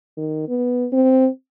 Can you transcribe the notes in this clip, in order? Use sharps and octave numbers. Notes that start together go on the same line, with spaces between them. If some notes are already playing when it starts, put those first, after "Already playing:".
D#3
B3
C4